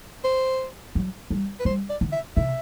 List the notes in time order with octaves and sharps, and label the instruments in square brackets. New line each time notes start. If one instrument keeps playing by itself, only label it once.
[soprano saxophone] C5
[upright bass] F#3
G3
[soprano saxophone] B4
[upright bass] G3 [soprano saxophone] C5
[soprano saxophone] D5
[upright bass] D3
[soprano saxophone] E5
[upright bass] C3 [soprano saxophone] E5